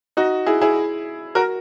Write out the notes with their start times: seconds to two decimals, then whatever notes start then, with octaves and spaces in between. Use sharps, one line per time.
0.17 D#4 F#4
0.46 E4 G#4
0.61 E4 G#4
1.35 F#4 A#4